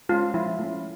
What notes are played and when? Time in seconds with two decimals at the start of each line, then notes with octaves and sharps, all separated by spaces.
0.09 G#3 F4
0.12 C#4
0.34 F3 E4
0.59 A3 C#4